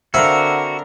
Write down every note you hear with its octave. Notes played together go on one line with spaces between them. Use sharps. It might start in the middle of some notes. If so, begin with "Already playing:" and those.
D3 C4 E4 F#4 A#4 F5 F#5